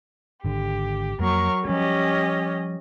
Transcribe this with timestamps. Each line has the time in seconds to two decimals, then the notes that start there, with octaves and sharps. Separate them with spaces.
0.45 G#1 D3 G4
1.19 F2 F#3 A#3 A#4 C#6
1.65 F3 G3 C#4 G4 D#5